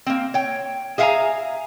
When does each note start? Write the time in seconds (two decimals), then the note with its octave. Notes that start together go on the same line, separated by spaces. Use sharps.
0.06 A#3 C4
0.34 C#5 G5
0.98 G#4 E5 F5 G5 G#5 A#5